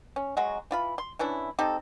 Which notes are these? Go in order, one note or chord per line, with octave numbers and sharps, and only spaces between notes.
C#4
F#3 G#3 F#4
E3 F4 B5
C6
E3 C#4 D4 E4
C4 D#4 G4 A4